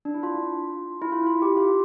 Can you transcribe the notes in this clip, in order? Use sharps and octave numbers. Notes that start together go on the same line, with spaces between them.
D4
E4
F4
E4
F4
E4
F4
G4
F4